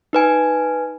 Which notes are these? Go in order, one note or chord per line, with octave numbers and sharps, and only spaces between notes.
D#4 B4 G#5